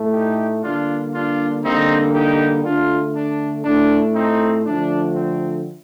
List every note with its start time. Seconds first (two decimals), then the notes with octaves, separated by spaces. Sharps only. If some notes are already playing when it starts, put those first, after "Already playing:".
Already playing: A2 A3
0.14 D#4 G4
0.63 D3 G3 A#3 D4 F4
1.14 D4 F4
1.64 D3 G3 A#3 C4 D#4
2.14 D#4 G4
2.65 D3 A3 D4 F4
3.15 D4
3.65 A2 A3 D4
4.15 C4 D#4
4.65 D3 F3 A3 D4
5.15 C4